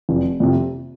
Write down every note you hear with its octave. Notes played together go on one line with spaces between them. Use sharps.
F1
F2 C3